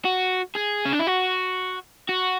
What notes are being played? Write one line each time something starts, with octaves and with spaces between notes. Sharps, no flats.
F#4
G#4
C#4
D4
E4
F#4
F#4